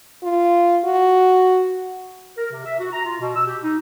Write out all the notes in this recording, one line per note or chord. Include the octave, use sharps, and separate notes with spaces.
F4
F#4
A#4
C3
E5
F#4
A#5
F4
B2
E6
G4
D#4